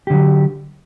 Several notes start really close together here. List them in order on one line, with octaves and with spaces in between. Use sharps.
G4 D3 F#3